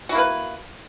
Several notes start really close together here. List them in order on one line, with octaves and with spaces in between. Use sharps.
F#4 E4 A#3 B4